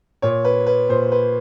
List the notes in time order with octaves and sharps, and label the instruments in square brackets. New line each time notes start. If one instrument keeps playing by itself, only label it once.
[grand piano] A#2 C#5
B4
B4
A#2 C5
B4